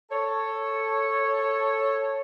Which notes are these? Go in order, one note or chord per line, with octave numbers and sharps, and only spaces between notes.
A4 C#5